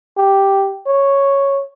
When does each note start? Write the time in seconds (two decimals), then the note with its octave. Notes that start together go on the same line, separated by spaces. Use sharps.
0.18 G4
0.87 C#5